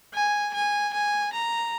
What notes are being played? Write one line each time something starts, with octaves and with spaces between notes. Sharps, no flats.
G#5
G#5
G#5
A#5